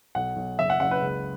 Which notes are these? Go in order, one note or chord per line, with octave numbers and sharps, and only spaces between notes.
B1 F#5
B1
F#1 E5
F#5
F#1 F#5
B4
C#2